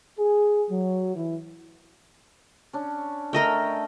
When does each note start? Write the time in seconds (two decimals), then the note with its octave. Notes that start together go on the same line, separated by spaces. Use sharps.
0.19 G#4
0.70 F#3
1.15 E3
2.73 C#4 D4
3.33 A3 A#4 D#5 G5